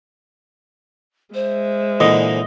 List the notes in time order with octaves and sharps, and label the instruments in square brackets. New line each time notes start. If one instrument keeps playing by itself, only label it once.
[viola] G#3 E5 [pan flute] C5
[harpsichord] A#2 D3 E3 [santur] D#5